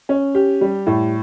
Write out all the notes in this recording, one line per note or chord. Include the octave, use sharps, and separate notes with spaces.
C#4
G4
G3
A2